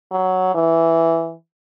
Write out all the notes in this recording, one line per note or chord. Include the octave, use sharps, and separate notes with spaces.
F#3
E3